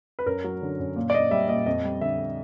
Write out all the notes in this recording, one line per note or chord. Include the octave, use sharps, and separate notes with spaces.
B4
F#2 A#4
F#3
D3
F#2
A#2
D5
A#3 D#5
G3 E5
A#2 D#5
F2 D#5
G3
D3 E5